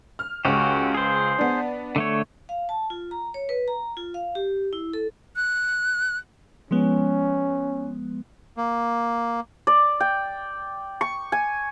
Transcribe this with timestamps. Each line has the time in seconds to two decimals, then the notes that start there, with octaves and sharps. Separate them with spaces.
0.19 F6
0.45 C#2 C#4 F#4 G4
0.95 G#4 C5
1.38 B3 D4
1.96 D3 A3 C#5
2.49 F5
2.69 A5
2.90 F4
3.11 A#5
3.34 C#5
3.49 B4
3.68 A#5
3.97 F4
4.14 F5
4.35 G4
4.73 E4
4.93 A4
5.36 F#6
6.71 F3 G#3 B3 C#4
8.57 A#3
9.67 D5
10.00 G5
11.01 C#6
11.32 G#5